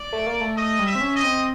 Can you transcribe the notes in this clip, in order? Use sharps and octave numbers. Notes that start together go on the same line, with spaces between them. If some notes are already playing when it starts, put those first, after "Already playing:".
Already playing: D5
A3
A#3
A3
A3 D#5
G3
E5
C4
C#4
D#5
C4